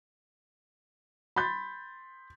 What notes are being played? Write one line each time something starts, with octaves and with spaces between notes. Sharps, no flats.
B5 C6 G6 A6